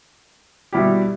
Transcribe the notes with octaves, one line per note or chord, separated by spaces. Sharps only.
B2 G3 E4 G4